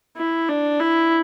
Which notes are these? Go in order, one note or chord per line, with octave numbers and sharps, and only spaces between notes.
E4
D4
E4